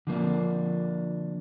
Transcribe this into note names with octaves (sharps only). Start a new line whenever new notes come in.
D3 F3 A#3 D4